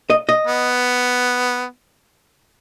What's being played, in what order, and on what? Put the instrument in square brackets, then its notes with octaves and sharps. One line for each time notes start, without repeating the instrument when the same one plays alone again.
[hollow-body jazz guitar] D#5
D#5
[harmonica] B3